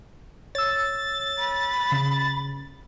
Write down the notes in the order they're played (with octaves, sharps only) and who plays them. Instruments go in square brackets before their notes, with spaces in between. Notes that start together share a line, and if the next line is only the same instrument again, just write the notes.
[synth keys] C#5 E6 [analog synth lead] A6
[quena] B5
[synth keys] C#3